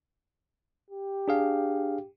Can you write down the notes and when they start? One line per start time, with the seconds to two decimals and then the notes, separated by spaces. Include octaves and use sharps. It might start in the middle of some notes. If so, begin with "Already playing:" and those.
0.90 G4
1.28 D4 G#4 F5